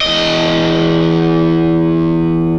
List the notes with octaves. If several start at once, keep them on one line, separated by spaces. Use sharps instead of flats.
E2 D#5